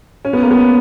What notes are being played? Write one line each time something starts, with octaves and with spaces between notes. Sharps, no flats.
C#4
B3
A#3
B3